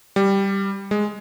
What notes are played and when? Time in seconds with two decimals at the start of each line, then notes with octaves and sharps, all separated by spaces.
0.16 G3
0.91 G#3